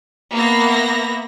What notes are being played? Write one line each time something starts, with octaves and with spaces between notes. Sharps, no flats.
A#3 B3 E5 B5 A#6